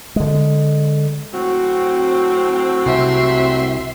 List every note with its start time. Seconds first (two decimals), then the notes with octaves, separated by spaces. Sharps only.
0.16 D3 G#3
1.34 A2 F#3 C4 F#4
2.86 C2 E5 C6